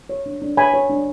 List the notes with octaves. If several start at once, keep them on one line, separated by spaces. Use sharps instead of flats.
C#5
D4
D4
C#5 G#5 B5
C#5
D4